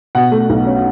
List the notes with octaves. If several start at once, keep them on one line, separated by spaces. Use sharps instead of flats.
B2 F#5
A3
B1
C#4